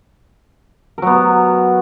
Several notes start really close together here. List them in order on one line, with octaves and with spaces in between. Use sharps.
A#4 F#3 B3